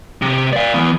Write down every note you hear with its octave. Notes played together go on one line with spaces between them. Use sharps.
C3
D5 F5
E3 B3